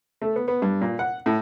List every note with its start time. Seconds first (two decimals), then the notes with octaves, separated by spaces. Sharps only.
0.22 A3
0.36 B3
0.48 B3
0.62 G2
0.81 A#2
0.99 F#5
1.26 A2